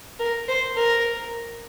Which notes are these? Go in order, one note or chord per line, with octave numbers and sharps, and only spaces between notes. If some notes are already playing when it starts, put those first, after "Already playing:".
A#4
C5
A#4